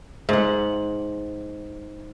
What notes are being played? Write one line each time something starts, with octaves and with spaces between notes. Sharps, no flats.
G#2 F#5